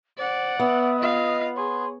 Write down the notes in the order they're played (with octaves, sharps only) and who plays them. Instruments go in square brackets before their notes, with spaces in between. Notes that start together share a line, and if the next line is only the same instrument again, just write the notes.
[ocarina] C5 [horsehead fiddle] D5 F#5
[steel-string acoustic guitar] B3 [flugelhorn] E5 [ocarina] D#6
[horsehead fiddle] F4 F5 [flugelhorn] D#5
[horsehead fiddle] G#4 [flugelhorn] C#5 [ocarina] C6